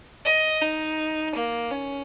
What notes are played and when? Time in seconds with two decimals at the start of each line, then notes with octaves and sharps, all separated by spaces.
0.25 D#5
0.62 D#4
1.35 A#3
1.71 C#4